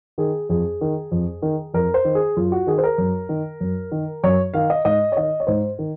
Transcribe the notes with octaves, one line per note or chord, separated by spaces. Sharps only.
D#3 G#4
F2 G#4
D#3
F2
D#3
F2 A#4
C5
D#3
G#4
F#2 F4
F#4
D#3 G#4
C5
A#4
F#2
D#3
F#2
D#3
F#2 C#5
D#3 F5
D#5
G#2 D#5
C#5
D#3 D#5
C#5
G#2 C5
D#3